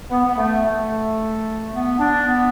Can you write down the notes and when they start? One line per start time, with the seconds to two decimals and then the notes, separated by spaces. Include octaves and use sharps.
0.11 B3
0.25 B3
0.37 A3
0.64 A3
1.72 B3
1.98 D4
2.25 B3